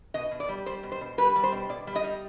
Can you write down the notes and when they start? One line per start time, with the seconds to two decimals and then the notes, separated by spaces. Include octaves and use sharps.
0.14 B2 D#5
0.31 B2
0.40 D5
0.49 G3
0.66 G3 C5
0.83 B2
0.92 C5
1.01 B2
1.18 G3 B4
1.36 G3
1.43 C5
1.52 B2
1.69 B2 D5
1.87 G3
1.96 D#5
2.04 G3